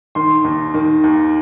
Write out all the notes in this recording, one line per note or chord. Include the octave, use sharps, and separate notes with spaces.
D#3 C6
D#2
D#3
D#2